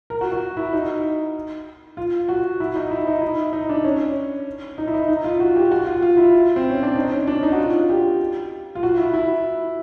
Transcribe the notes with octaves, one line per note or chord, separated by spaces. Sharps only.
A#4
F#4
F#4
E4
D#4
F4
F#4
E4
D#4
E4
D#4
E4
D#4
D4
C#4
D#4
E4
D#4
D#4
F4
F#4
G4
F#4
F4
F4
E4
C4
C#4
D4
D#4
C#4
D4
D#4
F#4
F4
G4
F4
F#4
E4
E4